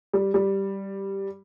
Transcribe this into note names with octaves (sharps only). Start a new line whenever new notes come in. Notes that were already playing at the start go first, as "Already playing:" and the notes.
G3
G3